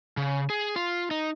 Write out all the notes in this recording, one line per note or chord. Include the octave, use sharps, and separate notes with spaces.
C#3
G#4
F4
D#4